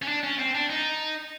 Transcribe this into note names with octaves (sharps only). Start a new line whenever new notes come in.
C#4
D4
C#4
C4
D4
D#4